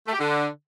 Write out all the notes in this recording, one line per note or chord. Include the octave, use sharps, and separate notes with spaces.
A3
G4
D3